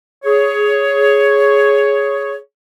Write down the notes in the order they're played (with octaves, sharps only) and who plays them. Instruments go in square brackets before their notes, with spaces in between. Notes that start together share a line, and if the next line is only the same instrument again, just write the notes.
[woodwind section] G#4 C#5